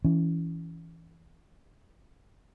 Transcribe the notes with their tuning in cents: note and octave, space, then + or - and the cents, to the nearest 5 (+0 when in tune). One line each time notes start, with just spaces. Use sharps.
E3 +0 C#4 +20